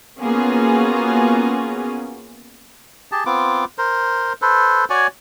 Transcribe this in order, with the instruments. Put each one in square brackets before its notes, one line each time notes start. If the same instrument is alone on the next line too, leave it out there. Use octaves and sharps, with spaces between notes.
[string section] A#3 B3 C#4 F4 F#4 G#4
[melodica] G4 G#4 A5
B3 C4 F4 D6
A#4 C5
A4 B4 C5
F#4 C#5 D5 G#5